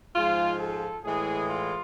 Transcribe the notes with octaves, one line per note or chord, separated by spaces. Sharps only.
G#2 F3 G#3 F4
A4
A2 E3 G#3 G#4
F4